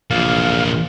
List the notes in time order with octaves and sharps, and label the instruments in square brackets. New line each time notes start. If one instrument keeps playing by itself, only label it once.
[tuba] A#1 [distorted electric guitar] E2 A#2 [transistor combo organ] F5